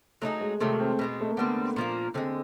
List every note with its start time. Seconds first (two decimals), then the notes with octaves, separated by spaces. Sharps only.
0.22 F#3 A3 A#3 D#4 G#4
0.41 G#3
0.60 C3 D#3 F#3 A3
0.80 C4
0.99 B2 G#3 C4
1.21 A3
1.30 A#3
1.37 D3 G3 B3 C4
1.76 A#2 F3 A#3
2.14 D3 F3 G#3 C4